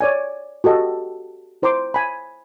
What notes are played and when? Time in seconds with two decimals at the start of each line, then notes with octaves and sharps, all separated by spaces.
0.01 C#5 D5 G#5
0.64 F#4 G4 A4 D#5
1.62 E4 C5 A#5 C6 D6
1.94 G#5 B5